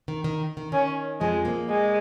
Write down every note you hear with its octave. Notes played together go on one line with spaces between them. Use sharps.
D#3
D#3
D#3
D#3 C#4
F2 F3 G#3
A#2 A#3
G#3